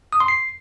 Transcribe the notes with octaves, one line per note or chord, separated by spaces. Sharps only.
D#6
C6
C7